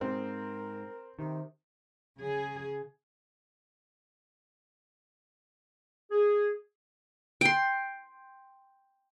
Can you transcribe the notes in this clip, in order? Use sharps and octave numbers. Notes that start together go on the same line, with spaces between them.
G#2 C4 A#4
C3 D#3
C#3 G#4
G#4
G5 C6